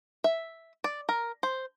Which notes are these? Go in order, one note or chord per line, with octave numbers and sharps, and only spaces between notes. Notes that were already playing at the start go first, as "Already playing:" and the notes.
E5
D5
A#4
C5